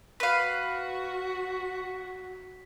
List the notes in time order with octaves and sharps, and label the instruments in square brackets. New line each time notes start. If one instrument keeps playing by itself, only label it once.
[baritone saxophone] F#4 [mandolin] B4 F5 [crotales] B6